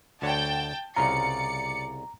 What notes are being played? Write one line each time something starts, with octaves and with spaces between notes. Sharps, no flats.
D2 D3 C#5 G5 A5
C2 C#3 F4 D5 A#5 C#7